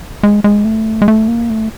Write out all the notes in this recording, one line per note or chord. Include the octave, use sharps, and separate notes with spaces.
G#3
G#3
A3
G#3
A3
A#3
A3